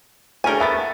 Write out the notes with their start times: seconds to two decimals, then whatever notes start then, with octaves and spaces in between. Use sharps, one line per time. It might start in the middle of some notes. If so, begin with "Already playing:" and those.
0.44 D2 C#4 D4 G#4 A#4 C#5 G5 G#5
0.60 A3 B3 E5 B5 A6